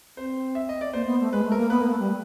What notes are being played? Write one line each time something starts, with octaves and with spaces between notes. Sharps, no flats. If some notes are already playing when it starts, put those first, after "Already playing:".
C4 C5
E5
D#5
D5
A#3 C5
B3
A3
G#3 B4
A3
A#4
A#3
B3 B4
A#3
A3
G3